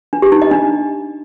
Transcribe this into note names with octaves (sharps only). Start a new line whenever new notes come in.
D4
G4
D#4
D#5
D4